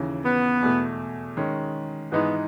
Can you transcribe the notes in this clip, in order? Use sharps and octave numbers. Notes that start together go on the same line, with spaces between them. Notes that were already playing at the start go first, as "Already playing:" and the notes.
Already playing: D#2 C#3 E3
B3
E2 B2 A3
D#3 G#3 C#4
G#2 E3 G#3 B3 D#4